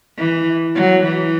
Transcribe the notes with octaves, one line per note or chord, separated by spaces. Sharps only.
E3
F#3
E3